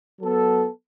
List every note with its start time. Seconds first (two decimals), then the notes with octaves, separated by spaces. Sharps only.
0.19 F#3 B3 A4